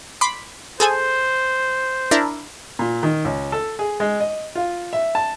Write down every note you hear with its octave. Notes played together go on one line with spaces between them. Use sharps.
B5 C6 D6
G#4 A4 C5 G#5
D4 E4 A#4
A#2
D#3
C#2
A4
G#4
G#3
D#5
F4
E5
A5